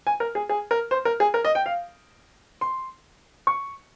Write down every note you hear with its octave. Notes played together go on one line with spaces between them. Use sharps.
G#5
A#4
G#4
G#4
A#4
C5
A#4
G#4
A#4
D#5
G5
F5
C6
C#6